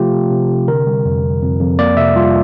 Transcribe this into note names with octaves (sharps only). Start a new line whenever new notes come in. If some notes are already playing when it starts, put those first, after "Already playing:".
Already playing: C3 F3 A3 F4 G4
C3
C3
C3
D3 A#4
G3
F2
F2
F2
F2
A#3 D5
C3 E5
G3 F4